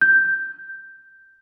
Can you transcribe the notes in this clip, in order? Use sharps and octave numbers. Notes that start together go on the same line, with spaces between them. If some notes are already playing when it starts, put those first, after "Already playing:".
G6